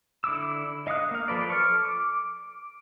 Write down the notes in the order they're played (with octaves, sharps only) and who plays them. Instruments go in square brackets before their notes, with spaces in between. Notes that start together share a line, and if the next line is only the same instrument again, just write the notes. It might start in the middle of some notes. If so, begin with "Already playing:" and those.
[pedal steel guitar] D3 E4 D6 E6
D#5 F5 F#5 D#6 F#6
A#3 F5
F3 A4 B4 D5
A4 C#6 D6 F6
D6